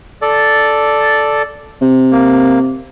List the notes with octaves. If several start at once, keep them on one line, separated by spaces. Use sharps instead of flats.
A4 D5
C3
A#3